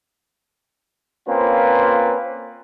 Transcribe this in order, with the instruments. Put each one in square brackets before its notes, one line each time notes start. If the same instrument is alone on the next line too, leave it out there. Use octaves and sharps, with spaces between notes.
[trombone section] A#3 C4 C#4 F4 B4